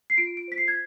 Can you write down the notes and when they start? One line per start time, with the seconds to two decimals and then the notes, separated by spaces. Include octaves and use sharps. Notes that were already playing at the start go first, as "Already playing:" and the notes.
0.10 C7
0.17 F4 D7
0.37 D7
0.48 C5 B6
0.58 C7
0.68 G#6